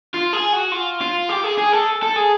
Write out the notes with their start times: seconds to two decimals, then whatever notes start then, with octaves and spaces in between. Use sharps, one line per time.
0.14 F4
0.33 G#4
0.53 F#4
0.72 F4
1.01 F4
1.30 G4
1.44 G#4
1.58 G#4
1.73 A4
2.03 A4
2.16 G#4